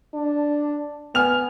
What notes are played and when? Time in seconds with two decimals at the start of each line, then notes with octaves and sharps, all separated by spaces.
0.14 D4
1.15 B3 G#5 F6 F7